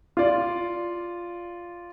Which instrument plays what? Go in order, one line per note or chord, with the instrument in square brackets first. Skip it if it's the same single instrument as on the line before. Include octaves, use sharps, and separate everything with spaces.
[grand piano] F4 D5